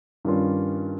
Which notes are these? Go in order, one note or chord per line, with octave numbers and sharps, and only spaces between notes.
G2 D#3 G3 C#4 F4